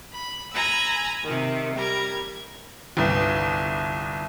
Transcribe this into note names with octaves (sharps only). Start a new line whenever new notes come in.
B5
G#5 A#5 B5 E6
C3 D#3
G3 A#4 G#6
G1 C2